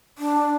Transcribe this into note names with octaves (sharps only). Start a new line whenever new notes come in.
D4